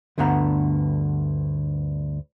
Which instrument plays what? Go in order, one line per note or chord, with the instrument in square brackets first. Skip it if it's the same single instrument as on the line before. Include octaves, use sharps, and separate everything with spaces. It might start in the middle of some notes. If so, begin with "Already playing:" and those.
[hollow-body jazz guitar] D2 G2 D3 B3 A#5